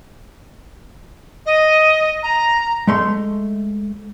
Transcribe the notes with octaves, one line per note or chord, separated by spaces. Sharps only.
D#5
A#5
G#3 A3 C6